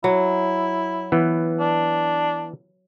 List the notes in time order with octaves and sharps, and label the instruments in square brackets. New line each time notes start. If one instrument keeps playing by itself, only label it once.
[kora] F#3 [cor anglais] E4
[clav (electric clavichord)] E3 B3
[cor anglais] D4